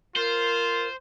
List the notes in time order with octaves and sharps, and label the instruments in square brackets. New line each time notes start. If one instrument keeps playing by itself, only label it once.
[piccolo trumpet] F4 [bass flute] A#4 [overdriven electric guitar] C5